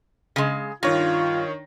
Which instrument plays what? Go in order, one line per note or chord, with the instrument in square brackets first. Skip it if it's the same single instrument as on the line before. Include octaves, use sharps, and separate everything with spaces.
[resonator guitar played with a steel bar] C#3 G#3
[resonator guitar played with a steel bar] G2 [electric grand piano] D#3 C#5 A#6 [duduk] F4